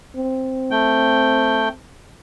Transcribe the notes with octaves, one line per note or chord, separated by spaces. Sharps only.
C4
A3 G5